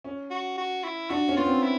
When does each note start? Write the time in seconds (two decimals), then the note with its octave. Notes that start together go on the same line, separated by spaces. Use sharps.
0.04 C#4
0.31 F#4
0.58 F#4
0.84 E4
1.10 D4 F#4
1.28 C#4
1.37 B3 F4
1.46 C4
1.63 E4